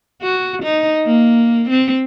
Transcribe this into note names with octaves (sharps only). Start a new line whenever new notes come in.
F#4
D#4
A#3
C4